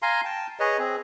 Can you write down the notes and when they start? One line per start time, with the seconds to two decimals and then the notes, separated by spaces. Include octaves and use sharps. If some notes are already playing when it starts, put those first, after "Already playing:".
0.02 F5 G#5 A#5 C6
0.25 G5 A5
0.60 G#4 B4 C#5 D#5
0.79 C4 G#4